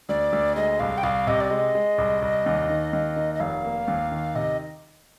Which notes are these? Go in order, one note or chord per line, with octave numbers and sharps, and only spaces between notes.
D2 D5
D2
G#3 D#5
C2 F5
G5
C2 F5
C3 D#5
D5
G#3 D#5
G#3
C2
C2
D#2
D#3
D#2
D#3
D#5
F1 F5
A#3
D#2
D#3
C3 D#5